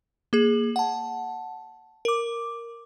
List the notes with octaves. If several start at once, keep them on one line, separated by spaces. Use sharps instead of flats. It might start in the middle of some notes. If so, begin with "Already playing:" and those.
A#3 G#4
F#5 A5
A#4 D6